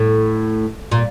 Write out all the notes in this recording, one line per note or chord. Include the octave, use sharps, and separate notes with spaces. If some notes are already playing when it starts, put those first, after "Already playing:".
Already playing: A2
A#2